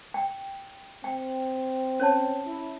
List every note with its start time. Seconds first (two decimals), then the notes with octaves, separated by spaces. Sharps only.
0.14 G5
1.04 C4 G5
2.00 C#4 C#5 A5
2.47 E4